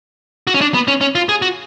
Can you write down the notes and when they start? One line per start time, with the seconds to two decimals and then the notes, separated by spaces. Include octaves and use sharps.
0.47 F#4
0.54 C#4
0.61 D4
0.74 B3
0.88 C#4
1.01 C#4
1.15 F4
1.29 G#4
1.42 F#4